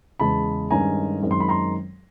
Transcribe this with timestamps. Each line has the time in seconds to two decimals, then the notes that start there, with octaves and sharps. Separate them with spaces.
0.20 E2 C#3 E3 G#3 A5 B5
0.71 G2 D#3 G#3 C#4 G#5 A#5
1.22 F#2 D#3 G#3 C4
1.31 C6
1.40 B5
1.49 A#5 C6